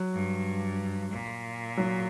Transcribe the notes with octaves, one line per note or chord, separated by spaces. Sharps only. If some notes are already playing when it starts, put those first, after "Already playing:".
Already playing: F#3
G2
A#2
F#3